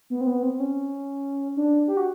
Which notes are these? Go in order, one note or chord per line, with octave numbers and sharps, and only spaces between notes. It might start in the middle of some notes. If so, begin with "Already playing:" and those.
B3
C4
B3
C4
C#4
D4
G4
F#4